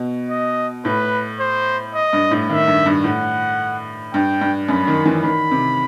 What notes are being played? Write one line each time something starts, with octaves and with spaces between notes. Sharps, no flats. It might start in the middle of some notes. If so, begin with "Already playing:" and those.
Already playing: B2
D#5
A2 B4
C5
D#5
G2
A2
D#3 E5
G2
G2
A2 F#5
G2 G5
G2
F#2 B5
D#3
E3
D#3 B5
C3